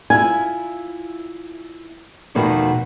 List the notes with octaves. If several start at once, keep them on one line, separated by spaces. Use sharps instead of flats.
E4 F4 G#5
E2 B2 D#3 F3 A3